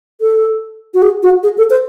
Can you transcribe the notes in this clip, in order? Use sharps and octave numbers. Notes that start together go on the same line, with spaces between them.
A4
F#4
G#4
F#4
G#4
A4
C5